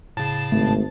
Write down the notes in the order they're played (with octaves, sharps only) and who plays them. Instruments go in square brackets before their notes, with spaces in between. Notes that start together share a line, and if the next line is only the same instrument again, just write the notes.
[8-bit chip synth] A2 C#3 [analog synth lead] A5
[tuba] G#1 [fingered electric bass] A3